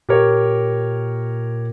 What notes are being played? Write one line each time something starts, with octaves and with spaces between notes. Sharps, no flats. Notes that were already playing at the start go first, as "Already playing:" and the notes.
A#2 G4 A#4 C#5